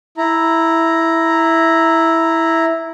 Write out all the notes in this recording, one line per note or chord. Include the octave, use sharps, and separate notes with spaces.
E4 A#5